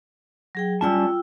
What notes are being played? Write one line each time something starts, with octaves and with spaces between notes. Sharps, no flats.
F#3 G#4 G5
G3 C#4 F4 G5 A5 E6